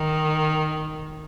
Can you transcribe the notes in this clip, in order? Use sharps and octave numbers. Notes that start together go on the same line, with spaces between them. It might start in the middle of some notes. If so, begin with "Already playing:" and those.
Already playing: D#3